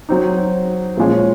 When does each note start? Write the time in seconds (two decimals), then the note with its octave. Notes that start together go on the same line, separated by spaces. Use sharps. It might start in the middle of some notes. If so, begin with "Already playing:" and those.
0.09 F#3 C4 D#4
0.97 A#2 F3 G#3 C#4 G#4